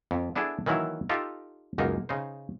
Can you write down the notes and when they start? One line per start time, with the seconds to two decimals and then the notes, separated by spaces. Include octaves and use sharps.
0.11 F2
0.36 B3 D4 E4 G#4 A4
0.66 D#3 E3 F#3 A#3 E4
1.09 D#4 F4 G4 A4
1.78 C#2 F#2 A#3 D#4
2.09 C#3 D#4 C5